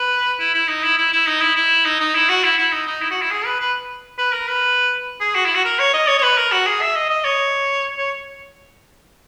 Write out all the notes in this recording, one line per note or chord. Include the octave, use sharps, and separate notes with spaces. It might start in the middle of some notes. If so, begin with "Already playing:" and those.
Already playing: B4
E4
E4
D#4
E4
E4
E4
D#4
E4
E4
D#4
D#4
E4
F#4
E4
E4
D#4
D#4
E4
F#4
E4
G#4
B4
B4
B4
A#4
B4
G#4
F#4
E4
F#4
A#4
C#5
D#5
C#5
C#5
B4
A#4
F#4
G#4
E5
D#5
D#5
C#5
C#5